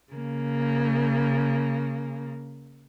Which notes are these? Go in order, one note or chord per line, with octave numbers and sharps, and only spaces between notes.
C#3 A#3